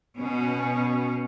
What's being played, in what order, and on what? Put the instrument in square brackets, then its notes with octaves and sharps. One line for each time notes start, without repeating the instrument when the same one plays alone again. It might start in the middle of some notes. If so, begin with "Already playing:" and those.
[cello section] B2 C#4